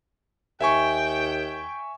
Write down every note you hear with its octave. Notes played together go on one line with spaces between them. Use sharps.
D#2 E5 G5 G#5 C#6